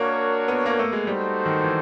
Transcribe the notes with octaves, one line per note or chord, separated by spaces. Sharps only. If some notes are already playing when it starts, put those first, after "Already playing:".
Already playing: A#3 D4 F#4 A#4 C#5
B3
A#3
A3
G#3
G3 D#4 F#4 A4 C5
D#3
E3